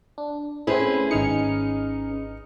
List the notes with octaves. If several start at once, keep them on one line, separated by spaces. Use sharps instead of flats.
D4
A3 C4 C#4 E4 G#4 B4 C5
G#1 D#4 F6 C#7